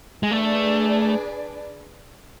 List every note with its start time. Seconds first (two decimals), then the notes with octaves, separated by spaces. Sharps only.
0.23 G#3
0.31 A3 D4 G#4 B4 D5